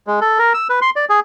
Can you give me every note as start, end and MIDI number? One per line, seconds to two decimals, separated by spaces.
0.07 0.20 56
0.21 0.39 69
0.39 0.53 70
0.54 0.68 88
0.69 0.80 71
0.82 0.90 84
0.96 1.05 74
1.09 1.20 68